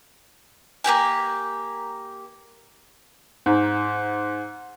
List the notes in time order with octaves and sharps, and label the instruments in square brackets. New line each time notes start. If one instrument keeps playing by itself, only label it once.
[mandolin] A#3 C#4 G4 G#5
[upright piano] G#2